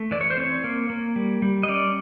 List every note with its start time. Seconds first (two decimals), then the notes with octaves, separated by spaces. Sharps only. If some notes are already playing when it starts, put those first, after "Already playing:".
Already playing: A3
0.11 E3 D5
0.21 C#5
0.30 C5
0.37 C4 C#5
0.64 A#3
0.90 A#3
1.16 G3
1.42 G3
1.63 D#5
1.68 C#4 D5